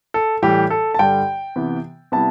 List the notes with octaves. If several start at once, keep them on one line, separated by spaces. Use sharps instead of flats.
A4
A2 E3 G3 G4
A4
A5
G2 D3 G3 G5
C3 E3 B3
C3 G3 B3 E4 A5